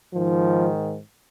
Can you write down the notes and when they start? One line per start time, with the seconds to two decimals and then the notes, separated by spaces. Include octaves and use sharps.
0.13 G#2 D#3 F3